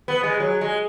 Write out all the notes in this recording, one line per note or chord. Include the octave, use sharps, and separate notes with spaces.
B3
G#3
F#3
G#3